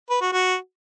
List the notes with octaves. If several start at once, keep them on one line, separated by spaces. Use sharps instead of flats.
B4
F#4
F#4